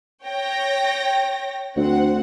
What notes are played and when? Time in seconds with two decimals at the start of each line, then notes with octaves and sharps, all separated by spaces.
0.24 C#5 G5 A#6
1.76 D2 C4 F#5